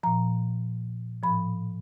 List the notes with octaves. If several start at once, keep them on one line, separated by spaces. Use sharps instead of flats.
A#2 F3 A#5
A2 F3 B5